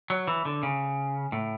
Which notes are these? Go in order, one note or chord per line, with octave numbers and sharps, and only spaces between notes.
F#3
E3
D3
C#3
A2